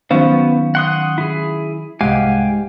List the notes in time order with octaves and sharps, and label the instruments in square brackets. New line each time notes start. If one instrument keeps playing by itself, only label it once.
[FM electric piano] D#3 F#3 [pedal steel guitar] B3 [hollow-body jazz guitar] C#4 C5 F5
[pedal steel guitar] F#5 C6 D#6
E4 G#4
[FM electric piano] C2 F#5 [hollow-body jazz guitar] G#2 [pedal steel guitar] G4 F5 G#5